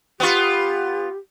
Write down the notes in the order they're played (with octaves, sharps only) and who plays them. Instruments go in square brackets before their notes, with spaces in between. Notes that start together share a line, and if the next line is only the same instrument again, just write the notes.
[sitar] B3 F4 [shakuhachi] G4